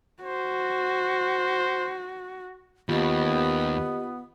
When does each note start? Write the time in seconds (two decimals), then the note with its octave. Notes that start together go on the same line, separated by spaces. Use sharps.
0.23 F#4 C5
2.89 D#2 B3 F4 G4 D#5